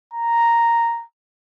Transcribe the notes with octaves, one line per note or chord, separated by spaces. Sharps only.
A#5